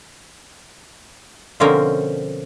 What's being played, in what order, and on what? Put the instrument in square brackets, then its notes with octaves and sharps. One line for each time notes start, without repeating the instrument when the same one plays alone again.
[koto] B2 D3 F3 C4 C#4 A#4